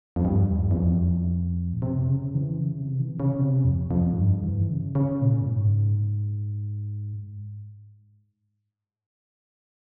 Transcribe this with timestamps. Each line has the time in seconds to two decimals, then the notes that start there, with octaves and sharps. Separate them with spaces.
0.16 F2
0.25 G2
0.50 E2
0.71 E2
0.76 F2
1.73 A#2
1.82 C3
2.08 C#3
2.34 E3
2.60 C#3
2.79 C3
2.99 E3
3.09 C3
3.20 C#3
3.39 C3
3.65 F2
3.91 F2
4.12 G#2
4.17 G2
4.44 E3
4.70 C#3
4.95 C#3
5.21 A#2
5.41 G2
5.48 G#2